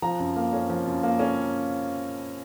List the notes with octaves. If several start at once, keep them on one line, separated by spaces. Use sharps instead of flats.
F3 A#5
F#2
A#3
C#4
F3
F#2
A#3
C#4